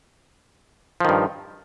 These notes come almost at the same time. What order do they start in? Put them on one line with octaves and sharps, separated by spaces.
F3 D#3 G2